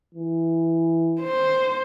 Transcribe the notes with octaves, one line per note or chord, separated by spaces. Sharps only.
E3
C5